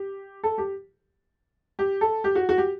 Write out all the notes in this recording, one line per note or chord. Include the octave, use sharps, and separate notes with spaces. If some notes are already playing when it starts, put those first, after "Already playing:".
Already playing: G4
A4
G4
G4
A4
G4
F#4
F#4
G4